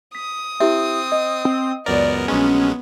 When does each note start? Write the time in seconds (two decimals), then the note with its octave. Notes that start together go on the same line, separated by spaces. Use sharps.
0.15 D#6 B6
0.60 C4 E4 G4 E5
1.12 D#5
1.45 C4
1.86 C#2 F#2 B3 A#4 D5
2.28 A#1 F#3 G#3 C#4